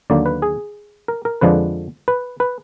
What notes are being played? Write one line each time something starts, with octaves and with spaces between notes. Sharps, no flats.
D#2 D3 F#3 A#3 D5
B4
G#4
A#4
A#4
F2 D3 F3 G#3 D4 B4
B4
B4